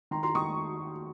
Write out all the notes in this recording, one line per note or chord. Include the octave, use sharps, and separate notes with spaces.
D#3 A#5 C6
A#5 C6
D#3 C#6 D#6